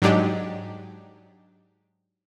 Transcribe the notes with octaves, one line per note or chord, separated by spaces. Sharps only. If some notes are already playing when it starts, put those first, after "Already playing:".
G#2 F#3 G#3 D4 D#4 G4